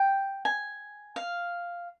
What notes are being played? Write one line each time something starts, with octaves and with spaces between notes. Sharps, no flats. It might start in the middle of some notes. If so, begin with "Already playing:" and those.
Already playing: G5
G#5
F5